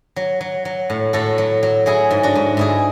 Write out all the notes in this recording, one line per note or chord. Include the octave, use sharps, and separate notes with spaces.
F#3
F#3
F#3
A2
A2 F#4 A4
F#3
F#3
F#3 E4 G#4
G#2
D4 F#4
G#2
G#2 E4 G#4